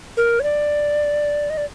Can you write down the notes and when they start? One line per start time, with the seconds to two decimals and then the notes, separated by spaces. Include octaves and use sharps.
0.17 A#4
0.40 C#5
0.43 D5
1.50 D#5
1.57 D5